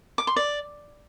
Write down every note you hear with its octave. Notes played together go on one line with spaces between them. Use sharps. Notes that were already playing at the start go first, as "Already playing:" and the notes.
D6
C6
D5